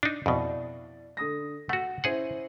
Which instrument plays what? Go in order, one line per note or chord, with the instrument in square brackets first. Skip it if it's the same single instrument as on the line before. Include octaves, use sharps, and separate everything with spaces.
[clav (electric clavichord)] D4 D#4
[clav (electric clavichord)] F2 B2 [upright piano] E4 D5
[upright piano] D3 D#6 A#6
[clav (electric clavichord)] A3 F#4 [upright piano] F#5
[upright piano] C#4 E4 C5 [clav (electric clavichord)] G#4 F#5